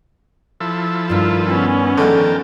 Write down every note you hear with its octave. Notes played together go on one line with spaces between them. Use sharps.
F3 E4 A4
G2 D#3 F4
B3 C#4
D3 D#3 F3 G#3 A#4 G5 A5